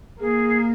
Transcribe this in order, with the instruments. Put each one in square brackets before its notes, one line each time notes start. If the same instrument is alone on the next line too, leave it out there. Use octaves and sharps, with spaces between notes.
[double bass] A#3 [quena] G#4